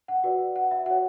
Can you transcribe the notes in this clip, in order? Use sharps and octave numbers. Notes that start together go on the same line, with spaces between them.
F#5
F#4 B4 D5
F#5
E5
F#4 C#5 F#5